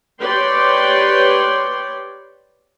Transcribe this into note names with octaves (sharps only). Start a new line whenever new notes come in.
G4 B4 C#5 D5 G5 C6